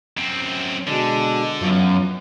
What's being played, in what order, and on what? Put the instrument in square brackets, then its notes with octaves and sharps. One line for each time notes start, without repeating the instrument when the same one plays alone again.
[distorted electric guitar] F#2 C4
[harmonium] B2 G#3 D4 [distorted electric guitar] D3
[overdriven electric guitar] F#2 [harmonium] B3 F4